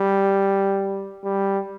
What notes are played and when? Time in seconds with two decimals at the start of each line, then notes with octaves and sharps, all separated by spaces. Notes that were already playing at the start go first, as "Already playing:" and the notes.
Already playing: G3
1.24 G3